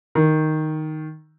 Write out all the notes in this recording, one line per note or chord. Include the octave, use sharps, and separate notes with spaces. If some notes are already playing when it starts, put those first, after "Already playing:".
D#3